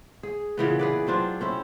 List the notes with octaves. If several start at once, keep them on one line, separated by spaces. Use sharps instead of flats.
G#4
A#2 C#3 E3 B3
G#4 B4 D5
F#3 C4 D4 F4
C4 C#4 E4